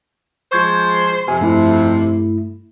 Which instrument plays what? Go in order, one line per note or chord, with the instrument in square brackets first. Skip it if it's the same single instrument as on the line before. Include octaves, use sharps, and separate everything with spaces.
[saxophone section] F3 G#3 C5 [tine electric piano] C#6 G6 G#6
[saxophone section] F2 C3 [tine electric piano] G#5
[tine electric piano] G2 A3 E4